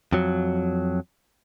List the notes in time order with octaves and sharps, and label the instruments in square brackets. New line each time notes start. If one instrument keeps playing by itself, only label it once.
[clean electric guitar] F2 F#3